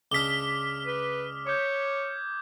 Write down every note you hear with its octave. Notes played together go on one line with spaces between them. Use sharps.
C#2 D4 D6 D#6 F6 B6 G7
B4
C#5 D6 G6 G#6